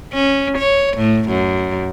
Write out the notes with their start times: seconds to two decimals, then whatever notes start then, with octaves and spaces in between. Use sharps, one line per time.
0.14 C#4
0.58 C#5
0.98 A2
1.30 F#2